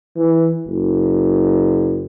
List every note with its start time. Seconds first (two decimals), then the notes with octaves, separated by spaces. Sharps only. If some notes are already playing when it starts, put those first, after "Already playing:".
0.16 E3
0.67 F#1